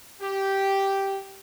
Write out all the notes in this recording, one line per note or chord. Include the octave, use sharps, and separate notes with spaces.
G4